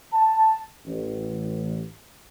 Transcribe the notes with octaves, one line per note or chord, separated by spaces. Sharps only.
A5
A1